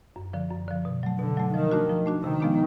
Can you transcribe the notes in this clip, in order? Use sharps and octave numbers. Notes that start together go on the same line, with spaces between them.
F#2
D3 F3
F#2
D3 F3
B2
F#3 A3
B2 D3
F#3 A3
D#3 F3
A3 D4 F#4
F3
A3 D4 F#4
C3 D#3
F3 G#3 B3 D4